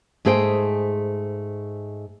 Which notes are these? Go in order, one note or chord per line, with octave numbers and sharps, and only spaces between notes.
G#2 A3 G#4 C5 G5